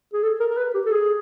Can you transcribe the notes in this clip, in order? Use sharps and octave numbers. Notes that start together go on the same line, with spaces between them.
G#4
A4
A#4
A#4
B4
G4
A4
G#4